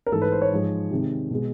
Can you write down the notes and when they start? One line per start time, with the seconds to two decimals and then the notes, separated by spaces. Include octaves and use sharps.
0.07 A#4
0.12 G#2 E3 A3 A4
0.22 B4
0.32 C5
0.42 C#5
0.51 G#2 F3 G#3
0.91 C3 D#3 G#3
1.31 B2 G#3